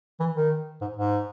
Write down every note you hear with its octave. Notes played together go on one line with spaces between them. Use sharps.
E3
D#3
G#2
G#2